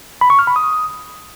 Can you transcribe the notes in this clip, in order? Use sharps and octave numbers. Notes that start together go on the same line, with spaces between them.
B5
C#6
F6
B5
D#6